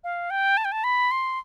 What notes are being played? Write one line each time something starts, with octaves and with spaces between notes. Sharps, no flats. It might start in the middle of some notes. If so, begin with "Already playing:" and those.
F5
G5
A5
G5
A5
B5
C6